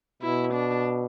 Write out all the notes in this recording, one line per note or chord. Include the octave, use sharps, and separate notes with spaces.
B2 E4
D4